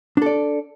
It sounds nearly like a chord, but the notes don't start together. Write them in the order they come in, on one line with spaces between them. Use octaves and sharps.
D4 A4 D5